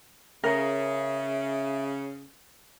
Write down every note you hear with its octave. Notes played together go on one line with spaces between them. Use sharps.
C#3 A#4 E5